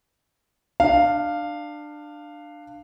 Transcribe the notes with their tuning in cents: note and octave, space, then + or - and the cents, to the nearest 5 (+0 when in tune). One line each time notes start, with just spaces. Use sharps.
D4 +20 F5 +0